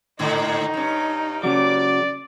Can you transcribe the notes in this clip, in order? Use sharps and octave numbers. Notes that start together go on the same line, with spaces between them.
G#2 D3 D#3 D#4
G2 C#4
C#3 F#3 D5 D6